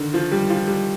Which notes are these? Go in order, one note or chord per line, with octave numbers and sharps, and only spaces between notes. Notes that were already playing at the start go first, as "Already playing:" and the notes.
Already playing: D3 D#3
F3
G3
F3
G3